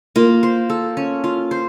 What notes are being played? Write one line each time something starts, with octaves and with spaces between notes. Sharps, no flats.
A#3 F4
C5
A4
C#4
F4
C5